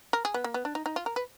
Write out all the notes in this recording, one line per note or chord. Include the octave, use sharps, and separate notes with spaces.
A#4
G#4
B3
A#3
B3
D4
D#4
D#4
F4
A#4
B4